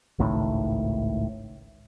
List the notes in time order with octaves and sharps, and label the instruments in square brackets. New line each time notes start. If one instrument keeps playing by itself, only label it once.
[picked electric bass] G#1 C#2 A2 D#3